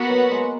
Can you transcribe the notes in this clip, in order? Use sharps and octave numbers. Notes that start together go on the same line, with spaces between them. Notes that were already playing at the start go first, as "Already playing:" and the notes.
Already playing: A#3 B3 F#4 B4 F#5
F#3
G#3